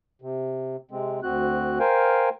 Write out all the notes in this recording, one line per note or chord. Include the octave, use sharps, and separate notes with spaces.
C3
C3 G#3 C4
D2 C4 F#4 F#6
A#4 C5 F5 G5 G#5